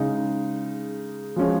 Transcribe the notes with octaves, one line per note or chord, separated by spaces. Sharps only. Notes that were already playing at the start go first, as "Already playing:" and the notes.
Already playing: C#3 G#3 D#4
F3 G#3 C#4